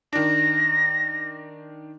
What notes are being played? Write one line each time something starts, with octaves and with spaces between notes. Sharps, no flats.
D#3 D4 A#6